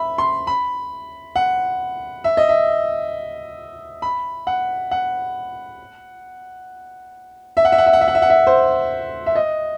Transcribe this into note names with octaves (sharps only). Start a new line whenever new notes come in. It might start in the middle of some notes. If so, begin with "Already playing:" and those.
Already playing: E5 B5
C6
B5
F#5
E5
D#5
E5
B5
F#5
F#5
E5
F#5
E5
F#5
E5
F#5
E5
F#5
E5
F#5
E5
C5
E5
D#5